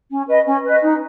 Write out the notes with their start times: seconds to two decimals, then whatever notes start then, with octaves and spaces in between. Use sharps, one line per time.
0.10 C#4
0.28 B4 D#5
0.46 C#4
0.64 B4 D#5
0.81 D#4